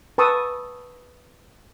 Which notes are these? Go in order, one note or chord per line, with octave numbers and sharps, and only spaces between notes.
B4 A5 C#6 D#6 E6